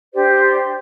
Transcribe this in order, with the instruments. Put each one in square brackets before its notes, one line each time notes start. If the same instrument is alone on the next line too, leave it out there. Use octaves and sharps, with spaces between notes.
[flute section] D4 G4 C5 D5